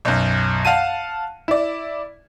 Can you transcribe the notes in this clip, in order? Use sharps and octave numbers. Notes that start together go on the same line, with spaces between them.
B1 F#2
F5 F#5 A5 D#7
E4 D5